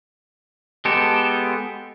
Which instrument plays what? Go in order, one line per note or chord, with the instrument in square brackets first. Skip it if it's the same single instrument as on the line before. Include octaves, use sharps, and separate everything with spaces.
[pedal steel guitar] G#3 B3 G4 A4